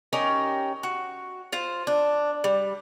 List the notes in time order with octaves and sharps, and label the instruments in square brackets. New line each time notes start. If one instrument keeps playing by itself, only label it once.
[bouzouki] C#4 D#4 G4 A#4
F#4
F4 C5
D4
G3